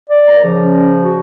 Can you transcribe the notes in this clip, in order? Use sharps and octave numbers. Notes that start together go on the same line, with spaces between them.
D5
D#2 A#5
C#3 F3
C#4
F#4